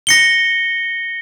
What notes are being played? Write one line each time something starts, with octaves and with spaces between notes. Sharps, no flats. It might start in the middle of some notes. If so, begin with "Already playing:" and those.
A#6 C#7 G7